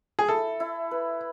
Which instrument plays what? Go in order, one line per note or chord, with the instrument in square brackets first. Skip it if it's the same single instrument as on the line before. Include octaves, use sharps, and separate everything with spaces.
[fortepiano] G#4
[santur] E4 [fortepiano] A4
[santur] E4
B4